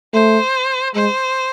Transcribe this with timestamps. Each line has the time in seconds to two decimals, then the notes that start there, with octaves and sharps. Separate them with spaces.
0.14 A3 C5
0.95 G#3 C5